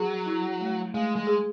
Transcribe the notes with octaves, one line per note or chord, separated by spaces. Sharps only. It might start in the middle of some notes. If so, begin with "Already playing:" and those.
Already playing: F#3 G#4
E4
A3
G#3 A3
G#3
G#4